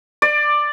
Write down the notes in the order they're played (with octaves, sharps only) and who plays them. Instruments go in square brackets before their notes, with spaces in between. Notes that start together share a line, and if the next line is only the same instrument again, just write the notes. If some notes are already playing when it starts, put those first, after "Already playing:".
[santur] D5